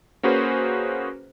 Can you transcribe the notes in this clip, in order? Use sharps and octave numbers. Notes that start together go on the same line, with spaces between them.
A#3 C#4 F#4 G#4 B4 C5